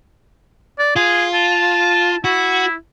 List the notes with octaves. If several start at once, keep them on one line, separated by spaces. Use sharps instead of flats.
D5
F4 G#4
A5
E4 F#4